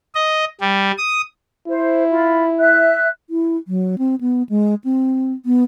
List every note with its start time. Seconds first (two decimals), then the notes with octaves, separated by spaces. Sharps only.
0.15 D#5
0.61 G3
0.98 D#6
1.68 E4 C5
2.11 F4 B5
2.59 E5 F#6
3.30 E4
3.68 F#3
3.98 C4
4.21 B3
4.49 G#3
4.84 C4
5.46 B3